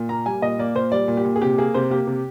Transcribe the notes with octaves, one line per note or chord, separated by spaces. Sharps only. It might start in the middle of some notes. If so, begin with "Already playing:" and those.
Already playing: A#2
A#3 A#5
G3 G#5
A#2 D#5
A#3 D5
A#2 C5
G3 D5
A#2
G4
A#2
G#4
C3 G4
A#3 G#4
C3 C5
A#3 G4
C3